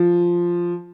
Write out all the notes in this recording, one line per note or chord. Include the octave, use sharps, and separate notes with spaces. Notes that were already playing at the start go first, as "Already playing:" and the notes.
Already playing: F3